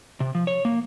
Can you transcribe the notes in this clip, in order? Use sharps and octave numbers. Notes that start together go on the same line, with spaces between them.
C3
F3
C#5
A#3